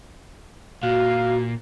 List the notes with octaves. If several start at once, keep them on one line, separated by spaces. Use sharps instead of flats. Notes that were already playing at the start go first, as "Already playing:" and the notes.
A#2 F#4 F5